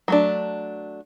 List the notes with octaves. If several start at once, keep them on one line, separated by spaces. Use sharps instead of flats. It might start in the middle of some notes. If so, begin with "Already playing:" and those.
F#3 A3 D4